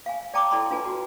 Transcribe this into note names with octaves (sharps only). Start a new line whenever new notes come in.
F5 G#5
D5 G5 A5 A#5 D6
E4 A4 D5 G5 A#5 C6
D4 F4 B4 G#5 A5
F#4